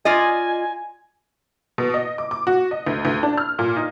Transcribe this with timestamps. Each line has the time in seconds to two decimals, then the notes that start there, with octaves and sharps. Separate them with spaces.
0.05 F4 D5 D#5 G#5
1.78 B2
1.94 D#5
2.18 D6
2.31 D6
2.47 F#4
2.71 D#5
2.87 D2
3.05 D2
3.23 D4
3.38 F6
3.59 A#2
3.76 D#4